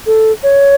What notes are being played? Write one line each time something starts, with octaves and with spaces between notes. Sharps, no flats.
A4
C#5